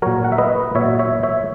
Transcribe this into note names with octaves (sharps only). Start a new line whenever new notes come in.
A#2 F#3 A#4 C#5
F#5
E5
B4 D#5
A#2 F#3 C#5 E5
C#5 E5
C#5 E5